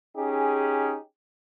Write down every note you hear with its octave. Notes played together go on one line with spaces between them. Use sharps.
C#4 D#4 G4 G#4